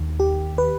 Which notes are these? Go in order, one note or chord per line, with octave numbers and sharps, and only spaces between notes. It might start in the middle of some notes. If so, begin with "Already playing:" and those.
Already playing: D#2 D#3
G4
B4